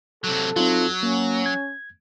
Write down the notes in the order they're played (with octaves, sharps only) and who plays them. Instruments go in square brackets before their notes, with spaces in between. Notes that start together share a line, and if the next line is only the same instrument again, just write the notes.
[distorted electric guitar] C3 F#3 [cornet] A4
[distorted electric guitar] F#3 [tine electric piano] C4 D#4 F4
[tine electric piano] A#3 [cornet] C#4
[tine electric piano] G#6